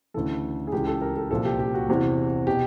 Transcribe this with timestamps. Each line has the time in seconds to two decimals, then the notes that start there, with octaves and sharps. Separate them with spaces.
0.14 D2 C#3 E3 A4
0.67 G#4
0.72 C#2 C#3 E3 G4
0.87 A4
1.01 A#4
1.16 A4
1.31 C2 A#2 F3 A4
1.45 G4
1.59 G4
1.74 F#4
1.89 E2 C3 E3
2.47 B2 G4